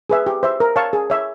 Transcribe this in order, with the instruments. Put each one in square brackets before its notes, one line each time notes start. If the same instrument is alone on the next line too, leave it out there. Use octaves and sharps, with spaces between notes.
[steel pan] G#4 B4 E5
G4
C5 E5
A#4
C#5 F5 A5 C#6
G#4
C#5 E5